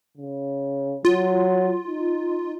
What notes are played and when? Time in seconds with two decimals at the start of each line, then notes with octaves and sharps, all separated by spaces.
0.18 C#3
1.05 F#3 F4
1.88 D#4